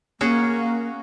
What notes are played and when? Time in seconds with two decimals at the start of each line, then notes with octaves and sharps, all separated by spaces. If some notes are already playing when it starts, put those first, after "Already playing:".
0.21 A#3 C#4 F#4 G#4